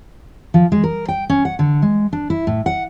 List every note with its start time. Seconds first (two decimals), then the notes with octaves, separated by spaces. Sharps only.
0.54 F3
0.72 G#3
0.84 A#4
1.08 G5
1.30 C#4
1.45 F#5
1.59 D3
1.82 G#3
2.13 D4
2.30 E4
2.47 A2
2.66 F#5